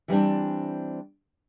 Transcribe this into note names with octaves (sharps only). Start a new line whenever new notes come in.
E3 G3 C4 D4